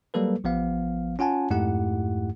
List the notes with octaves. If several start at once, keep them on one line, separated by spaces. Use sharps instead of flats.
F#3 G3 A#3 A4 B4
A1 F3 B3 F5
C#4 F4 F#5 G#5 A5
F2 G#2 A3 E4 G4 F#5